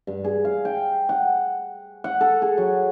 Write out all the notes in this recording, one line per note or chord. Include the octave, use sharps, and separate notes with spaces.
G2
G#4
F5
G5
F#5
F#5
A4
G#4
F#3